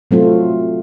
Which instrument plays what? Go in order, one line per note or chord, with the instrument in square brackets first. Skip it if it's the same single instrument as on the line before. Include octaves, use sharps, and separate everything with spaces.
[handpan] F#3 A3 C4 F4